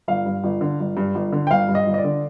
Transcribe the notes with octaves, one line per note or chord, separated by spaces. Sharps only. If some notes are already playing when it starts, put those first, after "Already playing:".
G1 F5
G2
G1
D3
G1
G2
G1
D3
G5
G1 F5
G2
D#5
G1
D#5
D5
D3